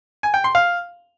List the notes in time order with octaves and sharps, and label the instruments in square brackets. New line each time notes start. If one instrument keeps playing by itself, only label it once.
[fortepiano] G#5
G5
C6
F5